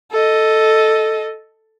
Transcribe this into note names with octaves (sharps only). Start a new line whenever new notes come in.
A4 D#5